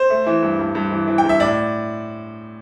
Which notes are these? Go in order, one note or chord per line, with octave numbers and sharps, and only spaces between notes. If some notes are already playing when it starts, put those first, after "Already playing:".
Already playing: C5
A3
E3
G2
G2
G2
E3
E3
G5
G2
E5
A2 D5